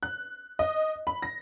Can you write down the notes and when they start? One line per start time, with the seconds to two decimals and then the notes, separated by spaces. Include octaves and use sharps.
0.03 F#6
0.59 D#5
1.07 B5
1.22 A#6